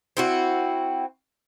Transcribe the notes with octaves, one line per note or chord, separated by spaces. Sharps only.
C4 E4 F#4